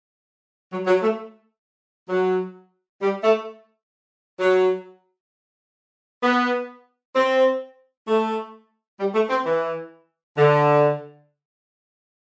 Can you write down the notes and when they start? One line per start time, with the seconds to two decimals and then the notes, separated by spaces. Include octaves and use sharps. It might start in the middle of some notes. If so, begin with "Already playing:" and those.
0.72 F#3
0.87 F#3
1.02 A3
2.09 F#3
3.01 G3
3.24 A3
4.39 F#3
6.23 B3
7.15 C4
8.08 A3
8.99 G3
9.14 A3
9.30 C4
9.45 E3
10.37 D3